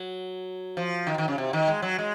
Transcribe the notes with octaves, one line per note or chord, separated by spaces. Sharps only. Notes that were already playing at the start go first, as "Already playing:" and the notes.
Already playing: F#3
F3
D#3
D#3
C#3
C3
D#3
G#3
F#3
G#3